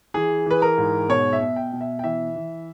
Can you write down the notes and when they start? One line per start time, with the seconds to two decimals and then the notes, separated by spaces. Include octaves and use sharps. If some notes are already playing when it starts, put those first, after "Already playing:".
0.14 E3 G#4
0.46 E3 B4
0.62 A#4
0.78 G#2
1.09 B2 C#5
1.33 E5
1.41 B2
1.56 G5
1.73 B2
1.81 E5
1.99 G5
2.04 E3 E5
2.36 E3